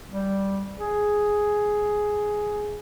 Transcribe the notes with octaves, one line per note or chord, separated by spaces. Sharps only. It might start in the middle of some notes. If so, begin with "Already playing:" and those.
G3
G#4